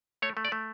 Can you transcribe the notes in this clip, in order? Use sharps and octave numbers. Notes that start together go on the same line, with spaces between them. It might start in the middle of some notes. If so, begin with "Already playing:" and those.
A3 C#5
A3
D5
A3